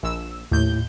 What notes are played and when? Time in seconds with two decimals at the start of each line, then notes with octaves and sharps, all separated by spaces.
0.03 A#1 E6
0.52 D#2 A2 G6